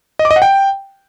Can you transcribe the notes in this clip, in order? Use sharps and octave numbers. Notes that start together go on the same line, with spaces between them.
D#5
D6
D#5
F#5
G5